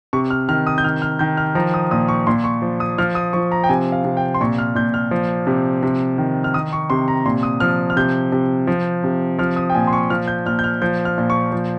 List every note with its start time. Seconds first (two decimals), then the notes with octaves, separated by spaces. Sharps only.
0.13 C3 C#6
0.30 F6
0.49 D#3 F6
0.67 D#6
0.78 G6
0.84 D#3 F6
1.02 F6
1.19 D#3 G6
1.37 F6
1.55 F3 A#5
1.74 D#6
1.91 A#2 D#6
2.08 C#6
2.27 A#2 C6
2.44 C#6
2.62 F3
2.80 D#6
2.98 F3 F6
3.15 D#6
3.33 F3 C#6
3.52 A#5
3.64 G5
3.69 C3 G#5
3.92 F5
4.05 C3
4.17 G5
4.34 C6
4.41 A#2 C#6
4.58 F6
4.75 A#2 G6
4.94 F6
5.11 F3
5.47 C3
5.83 C3
6.18 D#3
6.44 F6
6.54 D#3 D#6
6.73 C#6
6.90 C3 C6
7.08 A#5
7.25 A#2 C6
7.43 D#6
7.60 F3 F6
7.90 F6
7.96 C3 G6
8.32 C3
8.67 F3
9.04 C3
9.38 F3 F6
9.56 D#6
9.70 G5
9.74 A#2 G#5
9.87 C6
9.93 C#6
10.10 F3 F6
10.28 G6
10.46 A#2 F6
10.59 G6
10.64 F6
10.82 F3 G6
11.05 F6
11.18 A#2
11.30 C#6
11.52 F3